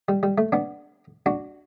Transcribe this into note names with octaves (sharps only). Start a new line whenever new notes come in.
G3
G3
A3
B3 D4
D4 F#4